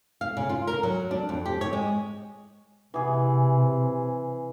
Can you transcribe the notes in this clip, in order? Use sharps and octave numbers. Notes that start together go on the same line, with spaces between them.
F5
C#3
F4
A#4
F#3
D4
F2
G4
C#5
G#3
C3 E3 G#4